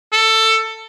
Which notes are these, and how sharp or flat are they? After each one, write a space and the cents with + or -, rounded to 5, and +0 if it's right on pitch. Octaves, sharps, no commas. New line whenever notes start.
A4 +15